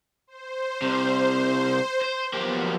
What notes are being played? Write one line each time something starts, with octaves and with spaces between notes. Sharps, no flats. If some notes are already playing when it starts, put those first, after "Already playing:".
C5
C2 C3
C5
F3 F#3 A#3 B3 G4